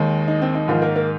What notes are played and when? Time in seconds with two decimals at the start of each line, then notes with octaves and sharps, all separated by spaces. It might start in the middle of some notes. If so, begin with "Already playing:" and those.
Already playing: D#2 D#3 G#3
0.28 D#4
0.42 C4
0.55 D#4
0.68 G#2 D#3 F3 G#3 F4
0.82 A#3 A#4
0.96 A#3 A#4